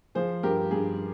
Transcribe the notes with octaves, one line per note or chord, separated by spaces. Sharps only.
F3 G#4 C5
G2 G4 A#4
G2 G#4